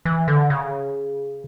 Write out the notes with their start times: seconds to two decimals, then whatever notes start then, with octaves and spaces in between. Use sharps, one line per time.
0.05 E3
0.28 D3
0.50 C#3